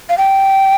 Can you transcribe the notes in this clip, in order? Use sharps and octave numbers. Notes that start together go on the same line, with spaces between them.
F5
G5